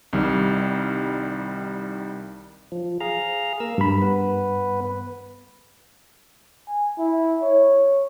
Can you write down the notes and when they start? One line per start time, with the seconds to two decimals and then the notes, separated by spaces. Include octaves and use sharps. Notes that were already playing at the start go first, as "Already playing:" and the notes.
0.13 C2 D#3 G3
2.72 F3
3.00 G#4 F5 A#5
3.60 A#3 A#4 E6
3.78 G2 A#4 B5
4.02 B3 B4
6.68 G#5
6.98 E4
7.43 C#5